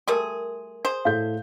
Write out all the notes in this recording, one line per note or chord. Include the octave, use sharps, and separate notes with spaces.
G3 A3 G#4 A#4 C6
G#4 C5
A2 A4 F5 G6